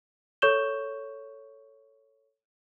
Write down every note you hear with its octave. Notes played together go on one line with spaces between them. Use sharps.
A4 C#5 C#6 G6 E7 G7